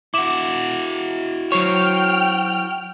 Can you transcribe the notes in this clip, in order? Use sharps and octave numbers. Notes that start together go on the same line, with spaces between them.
E4 F#4 D6 E7
F#3 C5 C#5 G5 C#6 F6